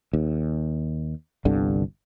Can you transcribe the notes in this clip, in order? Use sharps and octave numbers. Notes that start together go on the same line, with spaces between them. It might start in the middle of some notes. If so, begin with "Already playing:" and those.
D#2
G1 C2 G2 D3